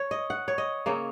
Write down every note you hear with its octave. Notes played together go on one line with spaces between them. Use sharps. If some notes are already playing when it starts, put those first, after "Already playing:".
Already playing: C#5
D#5
F#5
C#5
D#5
C#3 A#3 C#4